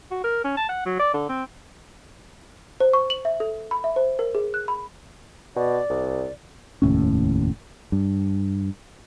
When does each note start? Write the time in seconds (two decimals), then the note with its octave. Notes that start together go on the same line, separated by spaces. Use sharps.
0.11 F#4
0.24 A#4
0.44 C#4
0.57 A5
0.69 F#5
0.86 F#3
1.00 D5
1.14 D3
1.29 C4
2.80 C5
2.93 C#6
3.10 F#7
3.25 E5
3.40 A4
3.71 B5
3.84 E5
3.96 C5
4.19 A#4
4.35 G#4
4.54 F#6
4.68 B5
5.56 B2 D5
5.90 C2
6.82 F1 D#2 A2 C#4
7.92 G2